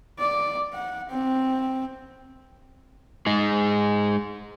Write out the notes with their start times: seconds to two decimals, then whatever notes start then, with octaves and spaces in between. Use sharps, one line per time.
0.19 D5
0.73 F#5
1.09 C4
3.26 G#3 D#4 G#4